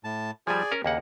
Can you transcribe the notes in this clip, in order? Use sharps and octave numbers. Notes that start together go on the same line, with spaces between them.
A2 A5
F3 G3 G#4 D5 G#5
C#4 A#4
D#2 C#3 A#3 F#5